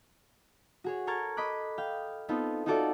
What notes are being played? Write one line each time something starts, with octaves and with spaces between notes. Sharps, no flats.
F#4 G#4 C#5
A4 A#4 C#6 F6 G#6 A6
D#5 B5 D6 F#6
F5 G5
B3 C4 D#4 F4 A4
D#4 F4 F#4 A4 D5 E5